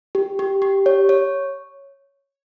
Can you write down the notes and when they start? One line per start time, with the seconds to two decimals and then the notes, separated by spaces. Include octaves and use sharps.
0.15 G4
0.39 G4
0.62 G4
0.86 C#5
1.09 C#5